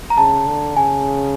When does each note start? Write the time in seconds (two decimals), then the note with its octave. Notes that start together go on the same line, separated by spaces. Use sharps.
0.10 A#5
0.17 C#3 A5
0.47 D3
0.76 C#3 G#5